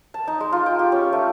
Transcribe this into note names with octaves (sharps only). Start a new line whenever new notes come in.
A5
D#4
G#3
F4
G5
G4
C#4
A3